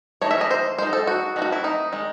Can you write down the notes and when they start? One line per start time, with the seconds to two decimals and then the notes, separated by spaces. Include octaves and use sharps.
0.22 E3 A3 D#4 C#5
0.31 E5
0.41 D#5
0.51 C5
0.78 G#3 D#4 C5
0.93 A4
1.07 F#4
1.36 D#3 A3 C4 D#4
1.42 F#4
1.52 E4
1.64 D#4
1.92 D#3 G#3 D#4